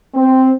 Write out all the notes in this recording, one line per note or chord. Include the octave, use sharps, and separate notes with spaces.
C4